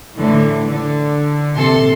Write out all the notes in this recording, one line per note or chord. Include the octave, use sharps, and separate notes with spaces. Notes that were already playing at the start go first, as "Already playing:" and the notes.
A2 D3 E3
D3
A#1 C3 A4 C6